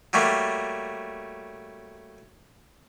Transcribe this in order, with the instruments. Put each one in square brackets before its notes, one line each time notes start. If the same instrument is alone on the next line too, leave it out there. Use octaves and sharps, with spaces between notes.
[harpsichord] F#3 G3 A3 A#3